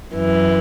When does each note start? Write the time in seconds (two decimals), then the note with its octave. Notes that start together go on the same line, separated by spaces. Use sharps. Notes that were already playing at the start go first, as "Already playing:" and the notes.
0.14 F#2 E3